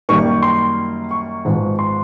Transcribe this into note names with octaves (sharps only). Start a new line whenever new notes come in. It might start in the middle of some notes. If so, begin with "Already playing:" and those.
F#2 D#3 G3 A#3 C#6
C6
C#6
G#1 G#2 F3 G#3 B3
C6